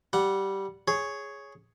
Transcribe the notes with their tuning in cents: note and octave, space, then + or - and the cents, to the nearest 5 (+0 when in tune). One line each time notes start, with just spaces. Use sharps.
G3 -10 F#5 +0
G#4 +0 C#5 +0